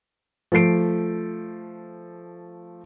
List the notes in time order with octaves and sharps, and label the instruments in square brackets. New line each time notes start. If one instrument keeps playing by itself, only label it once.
[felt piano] F3 A3 A4 C7 D7